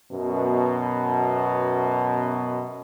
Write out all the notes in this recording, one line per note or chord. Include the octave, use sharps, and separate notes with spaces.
F#2 B2